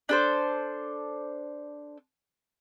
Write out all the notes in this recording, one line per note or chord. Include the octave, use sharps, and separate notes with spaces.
D4 A4 C5